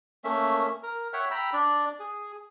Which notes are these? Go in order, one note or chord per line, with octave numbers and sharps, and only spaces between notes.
A3 A#3 C#4 E5
A#4
C#5 E5 F#5 G5
G5 A#5 B5 E6
D4 D5
G#4